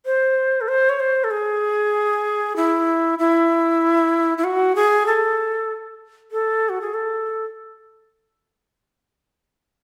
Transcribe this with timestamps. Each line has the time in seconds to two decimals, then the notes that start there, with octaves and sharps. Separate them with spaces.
0.06 C5
0.61 A4
0.68 C5
0.89 C#5
1.00 C5
1.24 A4
1.31 G#4
2.56 E4
3.19 E4
4.38 E4
4.44 F#4
4.76 G#4
5.07 A4
6.32 A4
6.69 F#4
6.81 G#4
6.94 A4